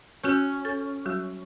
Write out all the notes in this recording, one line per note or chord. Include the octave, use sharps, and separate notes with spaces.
C#4 F#4 F#6 G6
A4 A6
F#3 G3 F#4